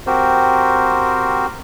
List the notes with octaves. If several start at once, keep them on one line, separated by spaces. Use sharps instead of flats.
C4 F#4 G4 A#4 C5